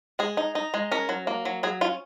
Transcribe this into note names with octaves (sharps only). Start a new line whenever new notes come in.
G#3 G#4
D#4
D#4
G#3
C#4 A#4
F#3
A#3
F#3
F#3 G#4
C#4 F4